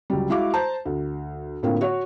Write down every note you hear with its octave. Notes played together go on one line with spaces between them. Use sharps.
C#2 F#3 G3
G#3 E4 F#4 F5 D6
C5 A5 A#5
D2
A2 D3 A#3 C4 F4
F#4 C#5 F#5